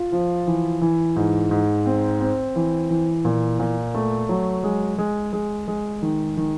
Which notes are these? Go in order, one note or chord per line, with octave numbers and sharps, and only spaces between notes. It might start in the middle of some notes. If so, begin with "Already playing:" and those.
Already playing: F4
F3
E3
E3
G#2
G#2
C4
C4
E3
E3
A#2
A#2
A3
F#3
G#3
G#3
G#3
G#3
D#3
D#3